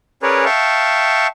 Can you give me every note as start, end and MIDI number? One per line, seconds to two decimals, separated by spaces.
0.23 0.45 61
0.23 0.45 68
0.23 0.45 70
0.23 0.45 71
0.23 0.45 73
0.23 0.45 74
0.45 1.27 76
0.45 1.27 77
0.45 1.27 79
0.45 1.27 81
0.45 1.27 85